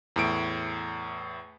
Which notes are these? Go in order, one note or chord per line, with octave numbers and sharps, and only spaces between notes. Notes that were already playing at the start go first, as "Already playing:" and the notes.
E2 A2 D7